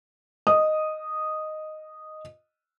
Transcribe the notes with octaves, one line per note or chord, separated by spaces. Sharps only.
D#5 D#6